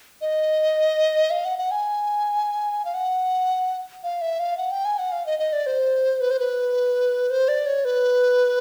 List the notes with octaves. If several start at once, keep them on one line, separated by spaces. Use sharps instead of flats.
D#5
F5
F#5
F#5
G#5
F5
F#5
F5
E5
F5
F#5
G5
G#5
F#5
F5
D#5
D#5
D5
C5
B4
C5
B4
C5
D5
C#5
B4